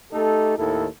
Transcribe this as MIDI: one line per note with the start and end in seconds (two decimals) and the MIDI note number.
0.13 0.55 57
0.13 0.55 63
0.13 0.55 67
0.13 0.55 69
0.59 0.87 39
0.59 0.87 45
0.59 0.87 51
0.59 0.87 64
0.59 0.87 69